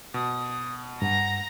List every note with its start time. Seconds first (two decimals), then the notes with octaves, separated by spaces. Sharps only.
0.14 B2 D#6
1.02 G2 F#5 A#5 A#6